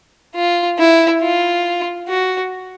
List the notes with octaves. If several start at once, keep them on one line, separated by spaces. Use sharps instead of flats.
F4
E4
F4
F#4